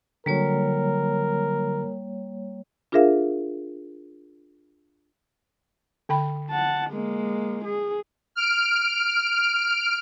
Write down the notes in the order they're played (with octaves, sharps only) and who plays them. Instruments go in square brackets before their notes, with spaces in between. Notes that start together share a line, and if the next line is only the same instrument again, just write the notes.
[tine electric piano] D3 F#3 [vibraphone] G3 A#3 C#5 [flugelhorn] A#4
[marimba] D4 F4 G#4 A#4 E5 F5
[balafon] D3 G5 B5
[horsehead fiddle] F#5 A5
G#3 A#3
G#4
[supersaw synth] F6 D7